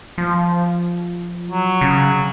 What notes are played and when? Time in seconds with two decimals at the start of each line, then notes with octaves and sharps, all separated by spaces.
0.18 F3
1.50 F#3
1.81 C#3